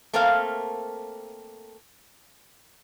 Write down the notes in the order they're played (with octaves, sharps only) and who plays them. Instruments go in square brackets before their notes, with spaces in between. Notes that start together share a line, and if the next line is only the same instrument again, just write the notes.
[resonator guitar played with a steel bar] A3 A#3 C4 A4 A#4 F5